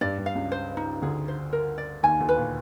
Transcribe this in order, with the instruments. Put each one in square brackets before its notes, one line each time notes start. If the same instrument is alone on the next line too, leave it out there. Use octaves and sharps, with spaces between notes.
[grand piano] G2 G3 [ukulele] D5
[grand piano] G2 G3
[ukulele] F5
[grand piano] C#2 C#3
[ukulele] C5
D#4
[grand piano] D2 D3 [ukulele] G#4
[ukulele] C5
A#4
D5
[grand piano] D#2 D#3 [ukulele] G#5
[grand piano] D2 D3
[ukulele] B4
[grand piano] A#2